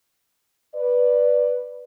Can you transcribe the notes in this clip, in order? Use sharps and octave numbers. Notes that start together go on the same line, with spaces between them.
B4 D5